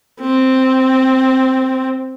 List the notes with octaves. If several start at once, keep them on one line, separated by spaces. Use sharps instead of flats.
C4